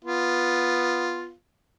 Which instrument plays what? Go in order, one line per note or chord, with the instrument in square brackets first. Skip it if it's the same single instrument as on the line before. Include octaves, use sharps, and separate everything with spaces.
[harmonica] B3 F4